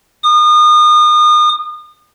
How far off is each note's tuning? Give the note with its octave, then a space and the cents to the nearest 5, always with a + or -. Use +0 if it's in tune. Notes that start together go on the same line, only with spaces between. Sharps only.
D#6 -35